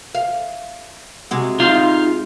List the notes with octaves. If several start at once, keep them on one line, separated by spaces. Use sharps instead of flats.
F5
C3 G#3 F#4
D#4 F4 F5